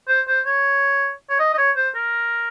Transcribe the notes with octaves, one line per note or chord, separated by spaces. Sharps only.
C5
C5
C#5
C#5
D#5
D#5
C#5
C5
A#4